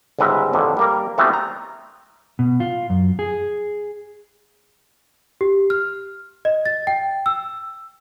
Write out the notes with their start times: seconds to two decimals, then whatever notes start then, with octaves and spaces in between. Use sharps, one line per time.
0.19 G1 C#2 G#2 B4 E5 A#5
0.53 A1 F2 D3 D#3
0.77 G3 A#3 A#4
1.18 E3 G3 A3 B3 C4 F#4
1.33 A#5
2.39 B2
2.60 F4
2.90 F#2
3.19 G#4
5.41 G4
5.70 F6
6.45 D#5
6.66 A6
6.87 G5
7.26 E6